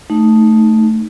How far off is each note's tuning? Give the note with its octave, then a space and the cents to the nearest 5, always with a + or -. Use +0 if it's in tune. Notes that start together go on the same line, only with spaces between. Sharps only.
A3 +0 D#4 +0